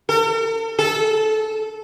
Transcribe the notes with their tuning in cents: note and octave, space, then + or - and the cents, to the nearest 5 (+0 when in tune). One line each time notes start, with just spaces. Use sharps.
A4 +45
A4 -20